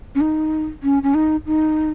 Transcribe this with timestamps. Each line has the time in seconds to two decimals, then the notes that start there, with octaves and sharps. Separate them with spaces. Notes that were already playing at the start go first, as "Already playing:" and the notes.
0.15 C#4
0.21 D#4
0.83 C#4
1.03 C#4
1.14 D#4
1.46 D#4